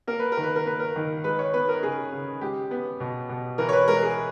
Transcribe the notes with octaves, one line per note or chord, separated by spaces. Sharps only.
A#3 A#4
B4
A#4
D#3
B4
A#4
A#3 B4
A#4
D#3
G#3 B4
C#5
B3 B4
A#4
C#3 G#4
C#3
G#3 G4
B3
B2
B2
E3 A#4
C#5
B4
G#3 A#4
G#4